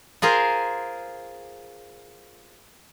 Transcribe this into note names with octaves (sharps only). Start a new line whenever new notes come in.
F4 G#4 A#4 C5